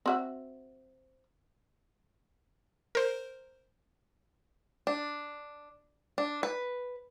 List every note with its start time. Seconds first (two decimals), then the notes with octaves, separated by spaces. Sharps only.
0.06 C4 F#4 E5
2.95 A#4 C5
4.87 D4
6.18 D4
6.43 B4